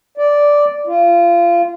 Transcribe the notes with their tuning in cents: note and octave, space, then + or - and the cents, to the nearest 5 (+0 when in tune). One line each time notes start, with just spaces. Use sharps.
D5 -5
F4 -25